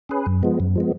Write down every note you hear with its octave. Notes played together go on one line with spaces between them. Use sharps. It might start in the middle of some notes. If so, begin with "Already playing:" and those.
C#4 G#4 B4
F#2
F3 G#3 B3
F#2
F3 G#3 B3